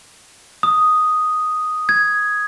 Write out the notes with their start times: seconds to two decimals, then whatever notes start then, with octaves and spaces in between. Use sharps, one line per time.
0.63 D#6
1.89 G#6